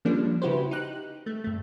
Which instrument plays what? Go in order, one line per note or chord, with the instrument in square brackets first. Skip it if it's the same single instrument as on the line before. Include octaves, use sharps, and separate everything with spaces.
[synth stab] F3 G3 G#3 A#3 C#4 D4
C#3 E4 F#4 G4 B4 C5
D#4 G4 F#6
A3
G2 A3